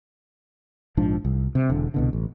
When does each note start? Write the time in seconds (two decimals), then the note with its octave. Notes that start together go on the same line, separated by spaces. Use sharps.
0.97 A#1 G#2 F3 D4
1.25 C2
1.55 C3
1.69 E1 D3
1.94 C2 B2 D3
2.13 A1